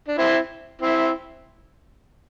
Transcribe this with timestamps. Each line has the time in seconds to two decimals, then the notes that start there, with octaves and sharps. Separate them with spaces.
0.08 D4
0.18 C4 E4
0.82 C4 E4